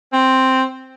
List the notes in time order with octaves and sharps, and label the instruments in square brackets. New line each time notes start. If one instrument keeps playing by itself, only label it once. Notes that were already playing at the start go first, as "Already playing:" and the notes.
[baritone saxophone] C4